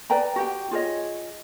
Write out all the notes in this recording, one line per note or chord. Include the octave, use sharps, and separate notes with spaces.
B4 D5 G5 A#5
F#4 G4 G5
F4 G#4 C#5 D#5